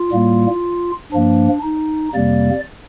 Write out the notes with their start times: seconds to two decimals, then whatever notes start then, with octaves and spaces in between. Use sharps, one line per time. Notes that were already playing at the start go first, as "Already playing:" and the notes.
Already playing: F4
0.11 A2 G3 A#3
1.12 G2 F3 A#3 D4
1.63 D#4
2.14 F2 C3 G3 A#3 D5